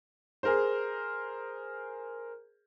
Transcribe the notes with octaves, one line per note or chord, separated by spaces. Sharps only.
G#4 A#4 C5